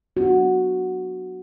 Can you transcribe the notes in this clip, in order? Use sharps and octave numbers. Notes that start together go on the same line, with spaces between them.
F#3 B3 D4 F#4